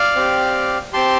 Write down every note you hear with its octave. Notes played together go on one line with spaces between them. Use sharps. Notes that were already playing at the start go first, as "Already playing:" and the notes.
Already playing: D5 F5
C4 G4
C4 G4 A5 C6